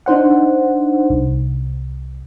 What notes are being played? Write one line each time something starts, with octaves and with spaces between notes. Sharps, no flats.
D4 D#4 C5 F#5
C2